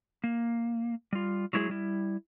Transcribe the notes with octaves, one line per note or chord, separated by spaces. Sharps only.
A#3
G3 F4
F#3 G#3 E4 F#4 G#4
G3 E4